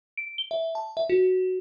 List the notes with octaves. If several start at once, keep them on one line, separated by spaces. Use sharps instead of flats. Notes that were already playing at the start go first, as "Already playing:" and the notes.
D7
G7
E5
A5
E5
F#4